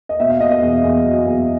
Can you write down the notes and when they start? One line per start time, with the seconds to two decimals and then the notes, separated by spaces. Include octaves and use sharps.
0.09 D#5
0.20 B2 E5
0.30 F5
0.40 B2 D#5
0.51 D#5
0.61 E2
0.83 E2
1.04 F#3
1.25 E2